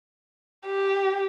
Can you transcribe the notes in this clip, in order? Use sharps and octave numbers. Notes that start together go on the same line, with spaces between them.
G4